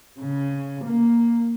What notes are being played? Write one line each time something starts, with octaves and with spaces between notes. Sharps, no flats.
C#3
A#3